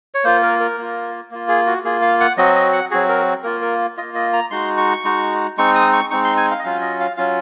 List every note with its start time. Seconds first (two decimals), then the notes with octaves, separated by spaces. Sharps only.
0.14 C#5
0.24 A#3 F4 C5
0.43 A#4
0.60 A#4
0.78 A#3 F4
1.31 A#3 F4
1.49 G#4
1.66 F#4
1.84 A#3 F4 G#4
2.02 F5
2.20 F#5
2.37 F#3 C4 F#4 D#5
2.55 D#5
2.73 F#5
2.91 F#3 C4 F#4 G#4
3.09 A#4
3.44 A#3 F4 A#4
3.62 A#4
3.97 A#3 F4 D#5
4.15 D#5
4.33 A#5
4.51 G#3 D#4 F#4 C6
4.78 C#6
5.04 G#3 D#4 F#4
5.58 G#3 C4 D#4 C#6
5.75 D#6
5.93 C#6
6.10 G#3 C4 D#4 C#6
6.24 C6
6.37 G#5
6.51 F5
6.59 D#5
6.64 F#3 C#4 F4 F5
6.81 D#5
7.00 F5
7.17 F#3 C#4 F4 F5